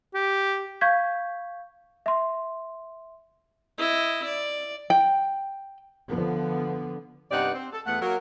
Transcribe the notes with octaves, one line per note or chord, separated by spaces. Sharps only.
G4
F5 C#6 G6 G#6 B6
E5 C6
E4 D#5
D5
G5
D3 F3 B3
G2 C3 B3 D#4 D5 F#5
C4
A4
E2 A3 B3 F#5
F#3 A#3 A#4